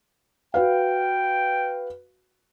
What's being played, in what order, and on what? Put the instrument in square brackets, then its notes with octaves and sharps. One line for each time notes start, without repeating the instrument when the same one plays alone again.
[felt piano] F#4 B4 F5 [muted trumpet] G5